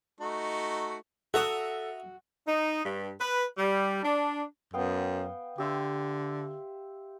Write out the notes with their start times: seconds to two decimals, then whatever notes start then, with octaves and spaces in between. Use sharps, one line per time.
0.20 A3 D#4 F#4
1.34 F#4 A4 E5 A#5 D#6
2.47 D#4
2.85 G2
3.21 B4
3.58 G3
4.03 D4
4.74 F#2 B3 F5 G5
5.58 D3 G4 E5 C6